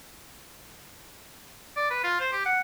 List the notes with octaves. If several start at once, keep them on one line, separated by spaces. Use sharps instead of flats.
D5
B4
F4
C5
G4
F#5